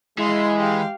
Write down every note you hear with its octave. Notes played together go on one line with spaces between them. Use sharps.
E3 G#3 F5 C6
G4 F5